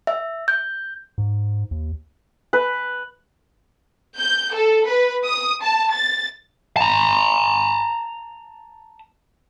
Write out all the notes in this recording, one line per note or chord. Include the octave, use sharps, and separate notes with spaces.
E5
G6
G#2
D#2
B4
G6
A4
B4
D#6
A5
A6
A5 A#5